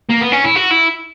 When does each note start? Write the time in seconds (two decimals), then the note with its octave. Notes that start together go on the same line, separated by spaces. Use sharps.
0.09 A#3
0.21 B3
0.32 C#4
0.45 E4
0.56 F#4
0.71 E4